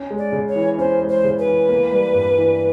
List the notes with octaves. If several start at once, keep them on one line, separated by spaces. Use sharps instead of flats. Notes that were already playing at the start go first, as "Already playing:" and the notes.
Already playing: C#4
G#3
D5
C#3
C#5
E3
C#4 C5
G#3
C5
C#3
B4
E3
A#3
G3
G2
E3